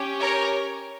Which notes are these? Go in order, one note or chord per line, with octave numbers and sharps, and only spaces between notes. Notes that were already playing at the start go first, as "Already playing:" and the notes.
Already playing: C#4 G4
A#4 C#5